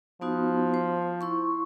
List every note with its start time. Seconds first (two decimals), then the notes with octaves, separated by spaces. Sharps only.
0.21 F3 B3 D#4 F#4
0.74 C5
1.21 E4 C6 C#6